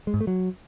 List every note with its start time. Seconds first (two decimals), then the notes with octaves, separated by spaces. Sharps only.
0.07 G#3
0.14 G#2
0.21 A3
0.27 F#3